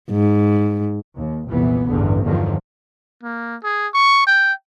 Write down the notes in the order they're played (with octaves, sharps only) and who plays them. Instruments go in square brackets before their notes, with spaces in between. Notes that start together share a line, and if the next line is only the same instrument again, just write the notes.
[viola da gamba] G#2
[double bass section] D#2
F1 C2 A#2 E3 B3
A1 E2 G2 D3
E2 G2 D3 D#3 F3 F#3
[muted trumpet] A#3
G#4
C#6
G5